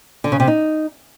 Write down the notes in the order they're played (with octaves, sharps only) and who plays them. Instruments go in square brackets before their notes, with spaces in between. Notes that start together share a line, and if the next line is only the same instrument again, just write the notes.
[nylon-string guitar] D3
C#3
C3
D#4